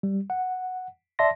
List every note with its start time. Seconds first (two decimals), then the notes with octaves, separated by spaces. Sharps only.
0.03 G3
0.30 F#5
1.19 D5 E5 A5 C6 A#6